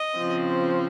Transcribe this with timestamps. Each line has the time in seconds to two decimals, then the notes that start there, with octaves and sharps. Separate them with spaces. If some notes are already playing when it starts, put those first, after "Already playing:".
Already playing: D#5
0.17 C#3 F3 C4